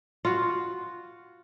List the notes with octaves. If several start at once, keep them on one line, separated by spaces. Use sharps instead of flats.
F4 F#4